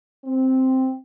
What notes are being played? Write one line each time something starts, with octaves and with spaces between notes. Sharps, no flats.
C4